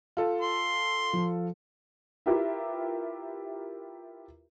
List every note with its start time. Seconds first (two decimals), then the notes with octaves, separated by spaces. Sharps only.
0.17 F4 A4
0.41 C6
1.13 F3
2.26 E4 F4 G4 A#4 B4 E5